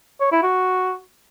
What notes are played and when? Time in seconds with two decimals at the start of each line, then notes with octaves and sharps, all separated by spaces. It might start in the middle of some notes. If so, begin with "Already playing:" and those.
0.21 C#5
0.32 E4
0.43 F#4